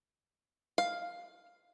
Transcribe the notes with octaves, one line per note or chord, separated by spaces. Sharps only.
F5